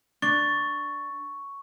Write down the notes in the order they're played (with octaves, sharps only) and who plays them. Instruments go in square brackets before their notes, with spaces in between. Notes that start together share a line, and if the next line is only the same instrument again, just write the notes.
[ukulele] D4 [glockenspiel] C#6 [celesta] A6